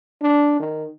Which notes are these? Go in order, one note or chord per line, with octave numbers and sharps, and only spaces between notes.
D4
D#3